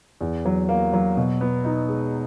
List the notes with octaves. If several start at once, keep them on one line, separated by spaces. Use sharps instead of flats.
E2
F#3
A#3
F#3
B2
B3
D#4
G#3